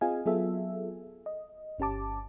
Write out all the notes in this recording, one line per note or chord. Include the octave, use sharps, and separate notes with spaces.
C4 F4 G#4 D#5 F5 G#5
F#3 B3 F4 G#4 A4 E5
D#5
G1 C#4 G4 A5 D6